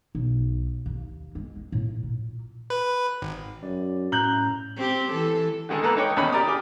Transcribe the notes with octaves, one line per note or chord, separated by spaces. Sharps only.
B1
D#2
G#3
C4
A2
A#2
B4
G#1
F#2 D5
A2 C#4 A#5 F#6 G6 F#7
C4 G4
E3 A4
D3 D#3 G#3 G#4 A4
G#2 A#3 A4 B4 A#5
D#4 B4 C#5 G5 D6
E2 A#2 D#3 C#4 D#5 B5
G4 A#4 D5 A#5 D#6
G4 G#4 D6